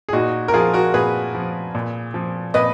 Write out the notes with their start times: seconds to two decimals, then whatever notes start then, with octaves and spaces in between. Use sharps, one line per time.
0.09 G#4
0.13 A#2 D#4 F#4
0.48 A#4
0.54 F3 F4 G#4
0.73 F#4 A#4
0.94 A#2 G#4 B4
1.35 F3
1.75 A#2
2.14 F3
2.54 A#2 B4 D#5